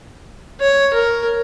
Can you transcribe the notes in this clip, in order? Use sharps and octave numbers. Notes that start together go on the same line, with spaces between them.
C#5
A#4